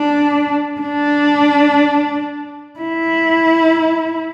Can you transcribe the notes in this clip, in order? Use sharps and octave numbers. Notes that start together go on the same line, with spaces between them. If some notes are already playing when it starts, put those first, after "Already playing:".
Already playing: D4
D4
E4